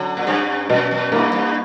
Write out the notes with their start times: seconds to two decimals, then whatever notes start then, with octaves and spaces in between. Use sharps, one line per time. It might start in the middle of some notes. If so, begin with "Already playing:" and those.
Already playing: D3 F#3 C#4
0.17 A#2
0.27 G2 C#4 G4
0.69 F#2 B2
0.91 F#2
1.12 G2 A#3 E4
1.33 G2